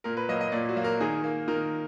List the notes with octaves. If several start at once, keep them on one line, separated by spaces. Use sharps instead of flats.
A#2 A#4
B4
F#3 A#3 D#5
D#5
A#2 D5
F#4
F#3 A#3
A#4
D#3 G#4
A#3
D#3 A#4